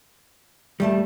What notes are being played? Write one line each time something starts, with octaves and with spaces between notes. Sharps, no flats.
D#2 G3 A3 A5